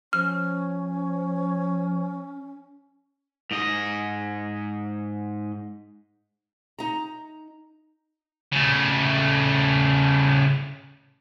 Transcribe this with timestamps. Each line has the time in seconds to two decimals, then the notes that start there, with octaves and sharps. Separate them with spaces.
0.13 F3 C#4 F6
3.51 G#2 D#5
6.79 D#4 A#5
8.53 C#3 A3